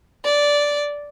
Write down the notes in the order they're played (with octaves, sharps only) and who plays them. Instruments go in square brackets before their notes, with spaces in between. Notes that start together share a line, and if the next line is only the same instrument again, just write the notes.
[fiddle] D5